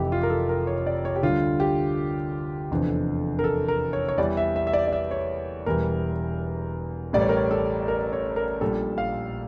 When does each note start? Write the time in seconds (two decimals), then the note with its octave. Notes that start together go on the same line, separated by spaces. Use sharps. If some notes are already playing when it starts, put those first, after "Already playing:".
Already playing: F1 F2 E3 G4
0.12 F4
0.23 A#4
0.30 A4
0.49 A#4
0.67 C#5
0.87 D5
1.05 C#5
1.16 G4
1.23 D2 D3 G3 F4
1.60 G4
2.71 F1 E2 D3 F3
3.39 A#4
3.44 A4
3.68 A#4
3.93 C#5
4.08 C#5
4.18 E2 E3 G3 D5
4.37 E5
4.56 E5
4.67 E5
4.73 D5
4.88 D5
4.93 E5
5.11 C#5
5.66 E1 E2 E3 G3 A#4
7.13 A1 A2 G3 D5
7.21 C#5
7.29 A#4
7.37 C#5
7.51 A4
7.88 A#4
8.13 C#5
8.36 A#4
8.61 A#1 A#2 G3 A4
8.98 F5